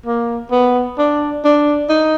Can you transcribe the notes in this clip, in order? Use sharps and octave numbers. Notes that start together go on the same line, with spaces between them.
A#3
B3
D4
D4
D#4